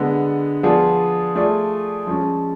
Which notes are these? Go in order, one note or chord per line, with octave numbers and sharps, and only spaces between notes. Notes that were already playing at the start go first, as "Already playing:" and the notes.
Already playing: D3 G#3 B3
F3 B3 F4 G#4 D5
A3 F4 G#4 D5
F3 G#3 C#4